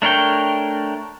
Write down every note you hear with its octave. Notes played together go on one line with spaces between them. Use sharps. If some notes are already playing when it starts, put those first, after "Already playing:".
A3 D4 A#4 C#5 G5